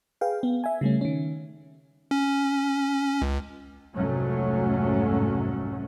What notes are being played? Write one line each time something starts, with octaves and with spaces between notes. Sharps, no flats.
G#4 B4 F5 G5
B3
E5 G#5
C#3 G3 A3 C#4
D#3 C#4
C#4
C#2
F1 C2 G#2 F#3 A3 C#4